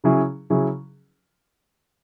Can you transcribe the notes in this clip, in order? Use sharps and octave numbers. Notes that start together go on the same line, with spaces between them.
C#3 F#3 C#4 E4 G#4
C#3 F#3 C#4 E4 G#4